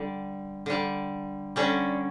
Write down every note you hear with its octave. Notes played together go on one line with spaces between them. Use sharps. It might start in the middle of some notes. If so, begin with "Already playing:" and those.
Already playing: D3 G3
D3 G3
D3 G3 C#4